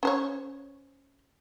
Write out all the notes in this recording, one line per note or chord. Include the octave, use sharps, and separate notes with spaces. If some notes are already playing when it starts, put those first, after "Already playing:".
C#4 C5 C#5